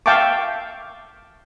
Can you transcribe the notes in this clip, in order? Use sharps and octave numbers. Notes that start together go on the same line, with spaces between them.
E5 F5 G5 A5 C#6 D6